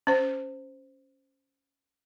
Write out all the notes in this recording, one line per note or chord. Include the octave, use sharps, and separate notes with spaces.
C#4 C5